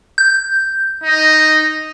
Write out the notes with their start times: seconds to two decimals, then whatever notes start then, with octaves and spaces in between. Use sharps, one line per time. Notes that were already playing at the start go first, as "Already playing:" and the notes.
0.18 G6
1.03 D#4